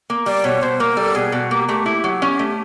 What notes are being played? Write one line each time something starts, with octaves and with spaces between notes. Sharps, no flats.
A#3
G3 D5
B2 C#5
B2 C5
A#3 A#4
G3 A4
B2 G#4
B2 F#4
A#3 G4
A3 G4
E4
F#3
C#4
A3